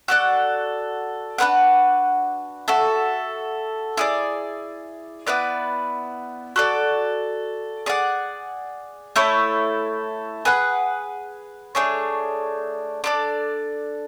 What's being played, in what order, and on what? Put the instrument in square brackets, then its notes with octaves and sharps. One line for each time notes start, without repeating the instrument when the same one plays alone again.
[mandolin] F#4 A4 D5 F#5
D4 F#4 B4 F#5
F#4 A4 E5
E4 G#4 D5
B3 E4 B4 D5
F#4 A4 D5
G#4 D5 F#5
A3 E4 A4 C#5
G#4 B4 F#5
A3 D4 G#4 C#5
D4 A4 D5